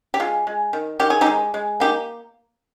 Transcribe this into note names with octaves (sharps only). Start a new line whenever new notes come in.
G4
G#3 F4 G#4
G#3
D#3
D#3 G4
G#4
D#4 G4
G#3
G#3
A#3 D#4 G4